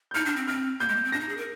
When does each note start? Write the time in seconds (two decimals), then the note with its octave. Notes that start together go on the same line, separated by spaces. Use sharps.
0.11 G6
0.14 D#4 F6
0.26 D4
0.36 C4
0.47 C4 F6
0.80 A#3 G6
0.88 G#3
0.96 A#3
1.04 C4
1.12 D4 A#6
1.20 D#4
1.29 G#4
1.37 A#4